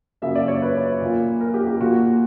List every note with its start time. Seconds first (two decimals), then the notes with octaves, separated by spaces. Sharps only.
0.22 F#2 C#3 F#3 A#3 E5
0.35 D5
0.48 C#5
0.62 B4
1.01 A#2 A#3
1.41 A#4
1.54 G4
1.67 G4
1.80 A#2 A#3 F#4